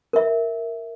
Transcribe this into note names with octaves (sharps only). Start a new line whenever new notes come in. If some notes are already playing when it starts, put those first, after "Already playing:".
A#4 E5